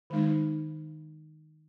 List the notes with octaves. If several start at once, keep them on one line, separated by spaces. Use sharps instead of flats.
D#3 G#3 D#4